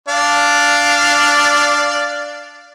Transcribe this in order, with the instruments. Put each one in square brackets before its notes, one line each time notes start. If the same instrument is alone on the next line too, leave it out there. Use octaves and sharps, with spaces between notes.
[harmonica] D4 D5 F5